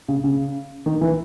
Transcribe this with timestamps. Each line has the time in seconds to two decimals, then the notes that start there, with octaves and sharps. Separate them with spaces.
0.08 C#3
0.24 C#3
0.86 D#3
1.01 E3